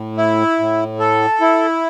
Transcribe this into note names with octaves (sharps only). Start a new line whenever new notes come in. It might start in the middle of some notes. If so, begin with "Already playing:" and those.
Already playing: A2
E4
A2
A4
E4